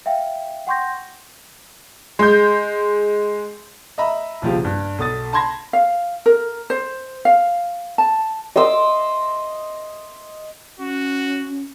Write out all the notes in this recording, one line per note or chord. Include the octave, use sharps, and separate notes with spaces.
E5 F5 G5
F#5 G5 C6 C#6 G6 A#6
G#3 G6
D#5 E5 A#5 B5
D#1 B1 C#3 F3 F4 G4
G2
B1 A4 D#6 A6
A5 B5 C6 G#6 A#6
F5
A#4
C5
F5
A5
D#5 C6 D6 E6
C#4 F#4